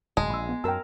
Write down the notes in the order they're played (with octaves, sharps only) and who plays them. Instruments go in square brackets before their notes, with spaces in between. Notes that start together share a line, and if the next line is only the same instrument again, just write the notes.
[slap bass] D1 F#2 [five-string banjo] G#3 [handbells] A5
[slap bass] A#1 [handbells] B5 C6 E6
[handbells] B3
[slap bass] F#2 [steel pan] A#4 E6 [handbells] G5 A5